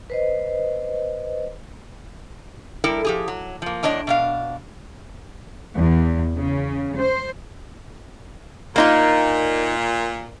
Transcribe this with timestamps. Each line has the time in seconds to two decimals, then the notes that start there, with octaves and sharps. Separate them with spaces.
0.10 B4 C5 D#5
2.84 G3 E4 A4 A#4
3.05 F3 G4 G#4
3.28 F#3
3.62 F3 A#3
3.83 E2 A2 D4 C#5 D#5
4.07 B2 D4 F5
5.76 E2
6.36 C#3
6.96 C5
8.76 A#2 A#3 D#4 F4